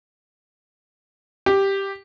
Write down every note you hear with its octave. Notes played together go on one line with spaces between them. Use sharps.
G4